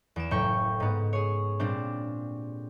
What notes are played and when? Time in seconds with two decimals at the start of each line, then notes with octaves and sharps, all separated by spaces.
0.16 E2 D7 E7
0.31 F#1 A2 G5 C#6
0.80 G#2 B3
1.13 G#4 C#5
1.59 A#2 G3 C4 D4